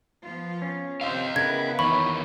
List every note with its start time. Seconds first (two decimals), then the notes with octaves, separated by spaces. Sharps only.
0.24 F3 B3 F4
0.62 C#4
1.01 C3 C5 D#5 F5
1.36 C#3 B3 E4 A#4 B4 F#5 G#6
1.79 E2 D#3 C#5 B5 C#6